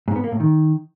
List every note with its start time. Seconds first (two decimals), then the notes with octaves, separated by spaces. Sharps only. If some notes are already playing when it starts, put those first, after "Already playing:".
0.08 G#2
0.16 B3
0.24 A#3
0.32 A2
0.40 D#3